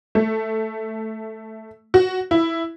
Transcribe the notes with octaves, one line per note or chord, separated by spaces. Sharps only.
A3
F#4
E4